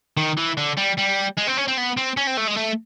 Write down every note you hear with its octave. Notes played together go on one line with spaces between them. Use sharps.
D#3
E3
D3
G3
G3
G#3
C4
C#4
C4
B3
C4
C#4
C4
A3
G#3
A3